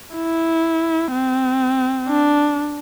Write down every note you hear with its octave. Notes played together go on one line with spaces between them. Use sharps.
E4
C4
D4